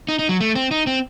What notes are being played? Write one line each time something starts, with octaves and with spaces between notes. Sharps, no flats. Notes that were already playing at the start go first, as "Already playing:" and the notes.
D#4
D#4
F#3
A3
C4
D#4
C4